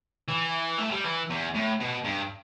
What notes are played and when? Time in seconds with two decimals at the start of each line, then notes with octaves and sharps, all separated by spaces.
0.28 E3
0.78 A3
0.91 G3
1.04 E3
1.30 E2
1.54 A2
1.80 B2
2.04 G2